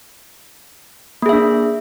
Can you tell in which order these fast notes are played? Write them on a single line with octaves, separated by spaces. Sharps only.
A#3 G#4 E5 D4